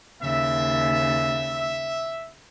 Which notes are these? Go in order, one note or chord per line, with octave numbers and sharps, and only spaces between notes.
D#2 C#3 E5